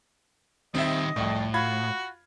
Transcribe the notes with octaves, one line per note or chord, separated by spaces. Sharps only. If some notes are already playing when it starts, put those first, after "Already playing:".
D#3 G3 C4 D#5 E5
C2 F2 A2
F4 F#4 B5 G#6